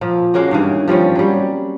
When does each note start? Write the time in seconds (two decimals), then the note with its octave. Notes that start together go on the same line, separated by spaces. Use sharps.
0.01 A#2 F3
0.34 G#3 A#3 C#4 F#4
0.51 G2 D#3 E3
0.88 F3 G3 C4 C#4
1.15 F#3 G3